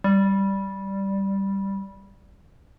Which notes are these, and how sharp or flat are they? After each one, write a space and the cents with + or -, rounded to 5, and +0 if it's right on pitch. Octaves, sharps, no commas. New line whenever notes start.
G3 -5